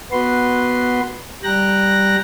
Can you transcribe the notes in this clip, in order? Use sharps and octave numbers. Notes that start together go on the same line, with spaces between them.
B3 F#4 B4 C6
G3 G5 A#5 F#6 A#6